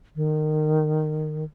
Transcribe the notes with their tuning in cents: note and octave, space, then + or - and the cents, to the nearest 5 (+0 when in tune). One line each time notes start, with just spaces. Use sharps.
D#3 -20